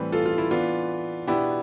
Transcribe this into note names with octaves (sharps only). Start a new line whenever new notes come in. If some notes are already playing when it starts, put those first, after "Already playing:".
Already playing: A2 E3 G3 C4 G4 B4
F4 A4
F4
E4
E3 B3 D4 F4
B2 B3 D4 E4 G4